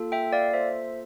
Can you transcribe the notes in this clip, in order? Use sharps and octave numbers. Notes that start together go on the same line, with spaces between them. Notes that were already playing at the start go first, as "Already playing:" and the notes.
Already playing: A#3 F4 A4
E5 G5
D5 F5
C5 E5